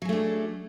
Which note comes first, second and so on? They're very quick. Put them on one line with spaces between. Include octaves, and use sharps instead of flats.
F#3 G#4 A3 D4